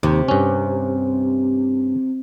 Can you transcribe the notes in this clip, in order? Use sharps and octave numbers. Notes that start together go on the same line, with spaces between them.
D#2 C3
G2 C#4